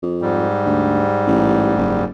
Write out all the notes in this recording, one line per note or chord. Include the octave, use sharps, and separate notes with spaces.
F2
G#2 G3
D2
A1
F#1